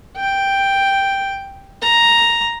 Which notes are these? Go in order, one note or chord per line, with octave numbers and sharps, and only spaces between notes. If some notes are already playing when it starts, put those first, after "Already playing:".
G5
A#5